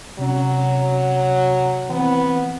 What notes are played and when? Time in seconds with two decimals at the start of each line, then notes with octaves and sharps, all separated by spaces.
0.19 C3 F#3 C#4
1.90 E3 B3 C4